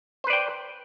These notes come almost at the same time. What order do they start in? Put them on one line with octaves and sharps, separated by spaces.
C5 B4 D5 G5